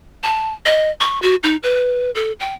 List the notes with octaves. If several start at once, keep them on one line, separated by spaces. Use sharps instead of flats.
A5
D#5
C#6
F#4
D#4
B4
A4
G5